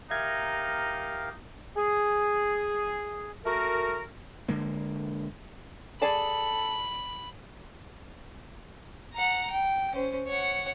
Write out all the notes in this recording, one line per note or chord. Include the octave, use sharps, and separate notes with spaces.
D#4 G4 A#4 E5 F5 G#6
G#4
A3 F#4 A#4
D3 G#3 A#3
G#4 A4 D5 A5 B5
F#5 A#5
G5
C#4 C5
C#5 F#5